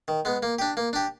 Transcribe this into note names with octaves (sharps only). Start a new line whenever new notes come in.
D#3
G#3 B3
A#3
D4 G4
A#3
D4 G4